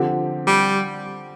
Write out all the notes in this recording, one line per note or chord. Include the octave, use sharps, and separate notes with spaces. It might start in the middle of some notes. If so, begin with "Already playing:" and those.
Already playing: D3 F3 C4 G4
G3